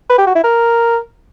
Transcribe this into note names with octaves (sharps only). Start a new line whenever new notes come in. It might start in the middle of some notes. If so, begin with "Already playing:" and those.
B4
G4
F#4
E4
A#4